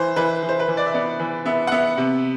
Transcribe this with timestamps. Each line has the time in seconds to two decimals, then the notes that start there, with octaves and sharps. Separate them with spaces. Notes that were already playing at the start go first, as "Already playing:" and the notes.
Already playing: E3 C5
0.16 E3 B4
0.43 E3
0.49 C5
0.60 B4
0.68 E3
0.77 D5
0.86 E5
0.94 B3 D5
1.20 E3
1.45 B3 E5
1.67 F#5
1.71 B3 E5
1.97 C3